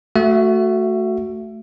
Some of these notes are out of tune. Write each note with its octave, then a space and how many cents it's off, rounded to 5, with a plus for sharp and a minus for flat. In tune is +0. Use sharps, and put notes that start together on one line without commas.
A3 +0 F#4 +0 E5 +25